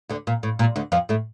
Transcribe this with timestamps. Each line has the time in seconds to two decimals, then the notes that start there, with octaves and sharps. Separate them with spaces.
0.09 D2 D3
0.27 A#2
0.43 A2
0.59 A#2
0.76 D2 D3
0.92 F2 F3
1.09 A2 A3